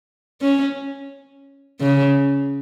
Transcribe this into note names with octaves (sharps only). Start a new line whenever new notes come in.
C#4
C#3